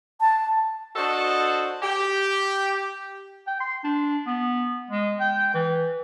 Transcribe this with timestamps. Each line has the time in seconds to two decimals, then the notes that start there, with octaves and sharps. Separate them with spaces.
0.21 A5
0.96 D4 F#4 A4 C5 D#5
1.83 G4
3.47 G5
3.60 C6
3.84 D4
4.27 B3
4.91 G#3
5.20 G5
5.54 E3